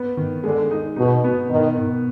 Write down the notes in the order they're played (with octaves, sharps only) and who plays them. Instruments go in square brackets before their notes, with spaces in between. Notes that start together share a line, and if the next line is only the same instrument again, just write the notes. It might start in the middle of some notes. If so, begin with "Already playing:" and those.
Already playing: [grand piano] B3
D#3
[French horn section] D3 [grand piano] G#3
[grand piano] D#4
[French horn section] B2 [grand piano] D#4
[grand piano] B3
[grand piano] B2 [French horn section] D#3
[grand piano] B2